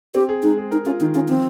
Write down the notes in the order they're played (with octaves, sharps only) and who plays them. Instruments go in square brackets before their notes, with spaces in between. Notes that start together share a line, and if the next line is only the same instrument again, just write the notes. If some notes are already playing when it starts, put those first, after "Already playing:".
[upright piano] C4 [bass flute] G4
[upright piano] G#4
[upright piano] G#3 [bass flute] D#4
[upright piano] G#4
[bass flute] D#4 [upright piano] A#4
[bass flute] C#4 [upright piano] F4
[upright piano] D#3 [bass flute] D#4
[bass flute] C#4 [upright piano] F4
[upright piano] F3 [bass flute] C4